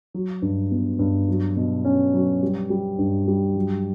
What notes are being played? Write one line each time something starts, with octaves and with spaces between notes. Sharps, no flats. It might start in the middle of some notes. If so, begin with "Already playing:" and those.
F#3
G2
B3
G2
F#3
B2
C#4
F#3
G3
G3
G2
G3
F#3